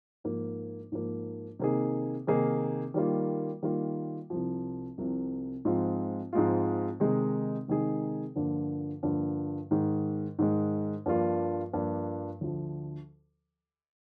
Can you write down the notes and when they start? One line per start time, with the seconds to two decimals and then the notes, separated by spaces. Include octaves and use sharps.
0.24 G#2 F3 A#3
0.92 G#2 F3 A#3
1.59 C3 D#3 A#3 D#4 G#4
2.27 C3 D#3 A#3 D#4 G#4
2.94 D#3 G3 A#3 F4
3.63 D#3 G3 A#3 F4
4.30 C2 C3 F3
4.98 C2 C3 F3
5.65 G#2 F3 G#3 C4 F4
6.33 G#2 F3 G#3 C4 F4
7.00 C3 D#3 G#3 D#4 G#4
7.68 C3 D#3 G#3 D#4 G#4
8.36 G2 D3 F3 A#3 F4
9.03 G2 D3 F3 A#3 F4
9.71 G#2 D#3 G#3
10.39 G#2 D#3 G#3
11.06 G2 F3 A#3 D4 F4
11.73 G2 F3 A#3 D4 F4
12.41 D2 D3 F3